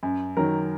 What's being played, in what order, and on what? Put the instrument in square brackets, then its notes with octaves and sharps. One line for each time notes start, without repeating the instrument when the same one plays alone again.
[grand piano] F#2
D#3 F#3 A#4